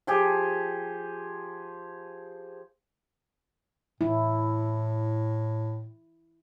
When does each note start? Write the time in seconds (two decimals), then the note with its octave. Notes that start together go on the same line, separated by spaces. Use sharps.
0.07 F3 G4 G#4
4.01 A2 E4